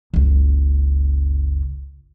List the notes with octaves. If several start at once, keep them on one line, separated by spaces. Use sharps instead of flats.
F#1 C#2